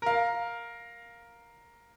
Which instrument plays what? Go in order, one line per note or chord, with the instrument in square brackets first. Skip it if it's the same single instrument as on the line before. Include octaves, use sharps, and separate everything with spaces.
[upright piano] A#4 F5